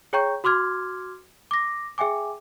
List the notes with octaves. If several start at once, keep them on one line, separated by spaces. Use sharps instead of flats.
G#4 C#5 G5 A#5 C#6 G6
F#4 C6 D6 F6 G#6
D6 A#6
G#4 E5 G5 G#5 D6